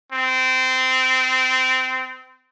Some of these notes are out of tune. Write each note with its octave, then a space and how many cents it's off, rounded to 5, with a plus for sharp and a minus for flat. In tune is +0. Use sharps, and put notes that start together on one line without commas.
C4 -20